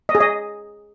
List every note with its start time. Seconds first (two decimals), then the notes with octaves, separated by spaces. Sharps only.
0.09 D#5
0.15 G#4
0.20 D#5